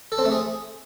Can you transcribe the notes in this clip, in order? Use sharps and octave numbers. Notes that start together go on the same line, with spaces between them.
A4
C4
A3
G#4